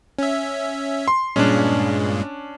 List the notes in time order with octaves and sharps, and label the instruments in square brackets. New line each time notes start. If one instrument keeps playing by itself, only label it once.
[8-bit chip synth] C#4 E5
[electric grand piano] C6
[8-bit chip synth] G2 A#2 G#3 [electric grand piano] C#4 D4